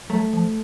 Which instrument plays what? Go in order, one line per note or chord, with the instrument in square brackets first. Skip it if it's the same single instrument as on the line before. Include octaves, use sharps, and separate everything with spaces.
[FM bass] F#3 [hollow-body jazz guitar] A3
[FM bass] F3